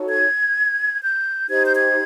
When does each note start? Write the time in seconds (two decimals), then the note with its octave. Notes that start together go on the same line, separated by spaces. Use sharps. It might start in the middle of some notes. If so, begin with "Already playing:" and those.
Already playing: D#4 F#4 A4 C#5
0.08 G#6
1.03 G6
1.49 D#4 G4 C5 G#6
1.65 G6
1.74 G#6